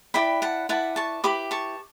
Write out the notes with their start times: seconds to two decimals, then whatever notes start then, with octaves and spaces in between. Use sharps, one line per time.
0.14 E4 B4 D5 G5 B5
0.42 F#5 A5
0.69 E4 B4 D5 F#5 A5
0.96 A5 C#6
1.24 E4 G4 B4 B5 D6
1.51 A5 C#6